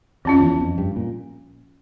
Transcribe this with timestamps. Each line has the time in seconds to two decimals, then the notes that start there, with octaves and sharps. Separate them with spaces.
0.25 F2 F3 C#4 F4
0.42 E2
0.61 F2
0.78 G2
0.96 A#2